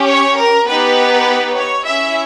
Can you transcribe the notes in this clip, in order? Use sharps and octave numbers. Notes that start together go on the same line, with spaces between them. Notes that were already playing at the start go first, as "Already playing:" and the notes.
Already playing: C#4 G4
C#5
A#4
B3 D#4 G4 B4
C#5
C#4 E4 G#4 E5